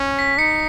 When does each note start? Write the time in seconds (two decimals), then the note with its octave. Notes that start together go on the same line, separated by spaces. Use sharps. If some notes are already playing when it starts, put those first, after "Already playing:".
Already playing: C#4
0.19 B6
0.38 D#4 C#7